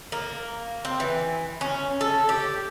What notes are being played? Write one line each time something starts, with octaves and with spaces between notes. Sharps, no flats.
A#3
C4
E3
C#4
A4
G4